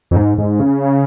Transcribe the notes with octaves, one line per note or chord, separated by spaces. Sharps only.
F2
G#2
G#2
C#3